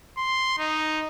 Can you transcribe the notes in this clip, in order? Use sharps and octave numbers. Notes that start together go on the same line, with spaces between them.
C6
D#4